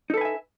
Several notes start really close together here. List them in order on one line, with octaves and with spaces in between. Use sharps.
D#4 A4 B4 G#5 E5